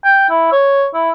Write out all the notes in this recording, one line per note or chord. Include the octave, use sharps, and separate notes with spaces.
G5
E4
C#5
E4